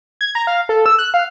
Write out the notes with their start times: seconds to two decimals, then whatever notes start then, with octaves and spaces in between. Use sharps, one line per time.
0.21 G#6
0.35 A#5
0.47 F5
0.69 A4
0.86 E6
0.99 F#6
1.14 F5